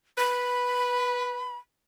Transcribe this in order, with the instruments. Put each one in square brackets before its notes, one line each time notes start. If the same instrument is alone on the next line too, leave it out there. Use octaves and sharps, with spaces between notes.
[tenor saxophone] B4 [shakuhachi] B5